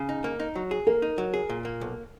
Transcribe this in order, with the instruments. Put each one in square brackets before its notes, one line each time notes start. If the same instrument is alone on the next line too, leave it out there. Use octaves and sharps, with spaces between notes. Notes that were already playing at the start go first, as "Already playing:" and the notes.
Already playing: [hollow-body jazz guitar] C#3
D#4
A#3
D#4
F#3
G#4
[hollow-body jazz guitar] A#3 [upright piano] A#4
[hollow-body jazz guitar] D#4
F#3
G#4
A#2
A#3
B1